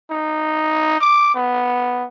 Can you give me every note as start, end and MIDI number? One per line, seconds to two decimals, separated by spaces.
0.11 0.97 63
1.01 1.31 86
1.34 2.05 59